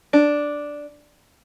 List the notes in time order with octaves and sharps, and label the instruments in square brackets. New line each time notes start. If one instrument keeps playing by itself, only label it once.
[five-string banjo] D4